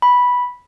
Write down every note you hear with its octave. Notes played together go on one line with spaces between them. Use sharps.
B5